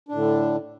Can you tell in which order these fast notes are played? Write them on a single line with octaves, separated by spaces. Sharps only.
D4 A2 D3